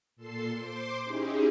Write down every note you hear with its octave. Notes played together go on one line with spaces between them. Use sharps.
A#2 A4 A5 C6 C7
C5 C6 D6
C#4 D#4 E4 G4 G#4